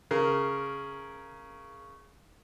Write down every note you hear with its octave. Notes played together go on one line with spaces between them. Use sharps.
C#3 A#4